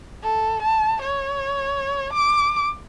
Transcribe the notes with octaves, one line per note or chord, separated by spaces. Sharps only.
A4
A5
C#5
D6